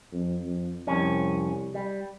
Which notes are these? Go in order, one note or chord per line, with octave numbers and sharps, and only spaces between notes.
F2
F2
C2 F2 C#4
G3